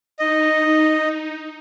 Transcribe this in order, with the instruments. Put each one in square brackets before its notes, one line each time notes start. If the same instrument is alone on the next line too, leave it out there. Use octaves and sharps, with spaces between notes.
[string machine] D#4 [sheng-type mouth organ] D#5